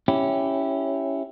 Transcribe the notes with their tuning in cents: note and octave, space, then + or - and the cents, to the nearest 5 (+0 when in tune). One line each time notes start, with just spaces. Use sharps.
C#4 +0 E4 +0 G4 -5